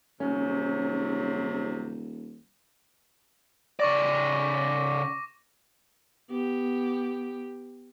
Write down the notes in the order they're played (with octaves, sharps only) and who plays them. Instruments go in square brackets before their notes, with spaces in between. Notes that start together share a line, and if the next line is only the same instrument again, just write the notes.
[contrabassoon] D#1 [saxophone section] G#2 C3 F#3 [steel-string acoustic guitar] C#4
[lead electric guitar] C#3 D5 [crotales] C#6 D6 A#6
[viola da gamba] B3 G4